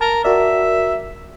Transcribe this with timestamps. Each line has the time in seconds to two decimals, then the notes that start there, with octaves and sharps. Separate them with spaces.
0.01 A#4 A5
0.24 F#4 A#4 D5 E5